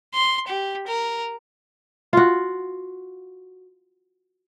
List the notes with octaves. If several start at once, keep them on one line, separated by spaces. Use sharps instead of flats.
C6
G4
A#4
F4 F#4